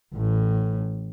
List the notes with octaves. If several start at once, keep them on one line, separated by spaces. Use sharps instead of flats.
A1 A2